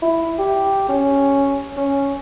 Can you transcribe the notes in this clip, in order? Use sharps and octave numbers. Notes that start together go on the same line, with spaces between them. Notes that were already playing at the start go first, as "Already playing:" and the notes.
E4
G4
C#4
C#4